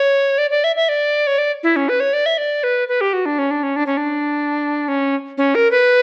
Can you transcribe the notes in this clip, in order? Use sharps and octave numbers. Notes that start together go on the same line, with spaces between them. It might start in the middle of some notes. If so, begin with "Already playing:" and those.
Already playing: C#5
D5
D5
E5
E5
D5
C#5
D5
E4
C#4
B4
C#5
D5
E5
D5
B4
B4
G4
F#4
D4
C#4
D4
C#4
D4
C#4
D4
C#4
C#4
A#4
B4